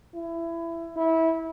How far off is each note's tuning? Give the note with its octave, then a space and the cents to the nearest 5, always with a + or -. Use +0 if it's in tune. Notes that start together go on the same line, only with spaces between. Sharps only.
E4 +20
E4 -20